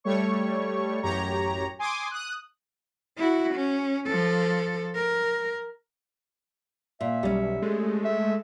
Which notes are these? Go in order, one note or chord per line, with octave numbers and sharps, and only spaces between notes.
G3 A3 C#5 C#6
A1 F#2 G4 C#5 A#5
G#5 C6 D6 D#6
D#6 F#6
E4 F#4
C#4
F3 A4
A#4
A#2 E5
B1 G3 C#4
G#3 A3
E5